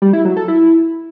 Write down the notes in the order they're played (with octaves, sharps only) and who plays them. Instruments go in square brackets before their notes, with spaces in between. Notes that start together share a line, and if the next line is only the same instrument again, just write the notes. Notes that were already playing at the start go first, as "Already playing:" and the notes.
[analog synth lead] G3
E4
F#3
A4
E4